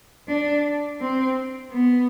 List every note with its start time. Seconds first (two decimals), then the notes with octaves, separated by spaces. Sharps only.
0.28 D4
1.01 C4
1.72 B3